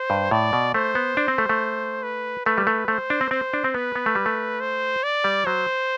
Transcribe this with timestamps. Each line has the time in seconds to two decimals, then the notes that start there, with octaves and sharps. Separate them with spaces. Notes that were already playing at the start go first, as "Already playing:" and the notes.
Already playing: C5
0.10 G2
0.31 A2 D5
0.53 B2
0.74 A3 C5
0.95 B3
1.17 D4
1.28 C4
1.38 A3
1.49 A3
2.03 B4
2.46 A3 B4
2.58 G3
2.67 A3
2.88 A3 C5
3.10 D4
3.21 C4
3.31 C4 C5
3.53 D4
3.64 C4
3.74 B3 B4
3.95 B3
4.06 A3
4.15 G3
4.26 A3
4.60 C5
5.03 D5
5.24 G3
5.46 F#3 C5